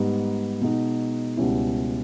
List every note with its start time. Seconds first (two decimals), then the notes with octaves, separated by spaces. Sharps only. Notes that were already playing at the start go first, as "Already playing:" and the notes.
Already playing: G#2 G3 B3 D#4 G4
0.61 B2 G#3 D#4
1.37 C#2 B2 G3 C#4 E4